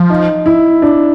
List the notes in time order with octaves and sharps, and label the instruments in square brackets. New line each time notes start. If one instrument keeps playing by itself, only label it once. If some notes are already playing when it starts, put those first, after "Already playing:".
Already playing: [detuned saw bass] F3
[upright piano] D#4
E4
D4